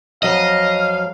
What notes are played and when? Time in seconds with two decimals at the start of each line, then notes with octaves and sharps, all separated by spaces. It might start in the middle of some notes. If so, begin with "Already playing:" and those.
0.23 F2 F#3 D#5 F5